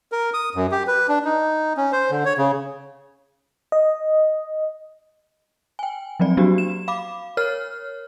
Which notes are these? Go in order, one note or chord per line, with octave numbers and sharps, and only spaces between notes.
A#4
D#6
F#2
G4
B4
D4
D#4
C#4
C5
D3
C#5
C#3
D#5
G5 G#5
F3 F#3 C4 D5
F#3 A#3 B3 D4 F#4 G4
E7
F5 B5 D6
A#4 C#5 F6